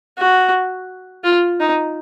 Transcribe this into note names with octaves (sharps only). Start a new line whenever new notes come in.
F#4
F4
D#4